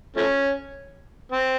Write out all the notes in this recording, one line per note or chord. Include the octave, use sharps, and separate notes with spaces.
F3 A3 C#4
C4